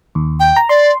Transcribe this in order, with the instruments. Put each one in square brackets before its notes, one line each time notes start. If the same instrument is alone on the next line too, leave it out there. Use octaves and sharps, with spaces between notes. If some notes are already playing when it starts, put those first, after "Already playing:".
[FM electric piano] D#2
[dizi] G5
[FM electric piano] A#5
[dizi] D5 [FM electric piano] C6